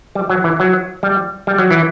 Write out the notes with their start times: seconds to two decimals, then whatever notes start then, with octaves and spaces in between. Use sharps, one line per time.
0.15 G3
0.30 F#3
0.44 E3
0.60 F#3
1.03 G3
1.47 G3
1.58 F#3
1.71 E3